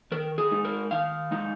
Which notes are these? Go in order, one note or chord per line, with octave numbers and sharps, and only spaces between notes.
D#3 A#4
G#4
G#3 D#4
A#4
D#3 F5
G#3 D#4